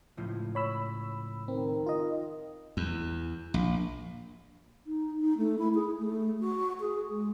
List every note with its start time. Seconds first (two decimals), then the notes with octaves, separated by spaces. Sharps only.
0.17 C#2 A2 F3
0.55 C#5 B5 E6
1.48 D#3 C4
1.86 F4 D#5
2.77 E2
3.54 A#1
4.86 D#4
5.20 D#4
5.37 A3
5.58 E4
5.74 G#4
5.99 A3
6.39 F#4
6.80 G#4
7.10 G#3